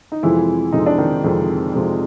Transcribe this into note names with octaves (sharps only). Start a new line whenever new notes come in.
D#4
F2 C3 E3 F3 G#3 E4
F2 C3 F3 G#3 D#4
D4
D#3 D#4
F2 C3 F3 G#3
F2 C3 F3 G#3